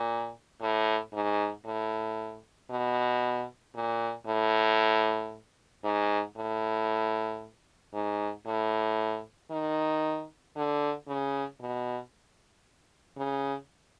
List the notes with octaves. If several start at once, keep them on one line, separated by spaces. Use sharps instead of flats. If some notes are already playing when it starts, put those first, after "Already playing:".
Already playing: A#2
A2
G#2
A2
B2
A#2
A2
G#2
A2
G#2
A2
D#3
D3
C#3
B2
C#3